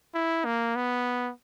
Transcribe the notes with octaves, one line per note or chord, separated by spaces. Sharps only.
E4
A#3
B3